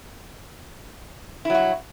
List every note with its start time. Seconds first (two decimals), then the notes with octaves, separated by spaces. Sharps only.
1.45 E4
1.50 F#3
1.54 F#4